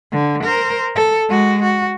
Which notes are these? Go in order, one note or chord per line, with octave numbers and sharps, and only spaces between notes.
D3
A#4 C5
A4
G#3 F#4
F#4